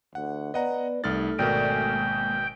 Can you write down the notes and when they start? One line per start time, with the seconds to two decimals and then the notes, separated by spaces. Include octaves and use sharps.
0.15 D2 F#5
0.54 B3 B4 D5 D#5 F#5 A#5
1.04 C2 A3 D#4 F6 A6
1.39 G#1 B2 A#4 D5 G5
1.70 G#3 A#3